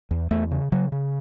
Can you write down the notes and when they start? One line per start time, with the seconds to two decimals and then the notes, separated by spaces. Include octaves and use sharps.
0.11 E2
0.31 E2 A3
0.51 C#3
0.72 C#3 F#3
0.92 C#3